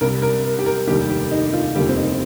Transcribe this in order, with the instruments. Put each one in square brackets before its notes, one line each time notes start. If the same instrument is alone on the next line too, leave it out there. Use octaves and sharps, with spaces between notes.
[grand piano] C2 C3 G3 A#4
A#4
A#4
G4
A#4
F1 D#2 D#3 G3 G4
G4
D#4
D#4
F4
F1 D#2 D#3 G3 G4
C4
D#4